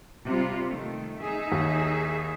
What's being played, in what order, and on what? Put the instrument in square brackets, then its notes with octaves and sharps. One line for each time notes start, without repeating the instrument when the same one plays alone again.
[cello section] C3 G3 F4
D#3 A3
D#4 G#4 E5
[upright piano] D#2